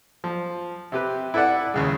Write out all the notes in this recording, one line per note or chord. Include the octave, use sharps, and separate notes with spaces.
F3
C3 G4 B4
E4 A4 B4 D5 F#5
D#2 C#3 G#3